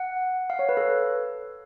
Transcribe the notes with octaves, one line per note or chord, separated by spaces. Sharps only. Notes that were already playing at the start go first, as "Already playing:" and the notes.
Already playing: F#5
F5
C#5
B4
A4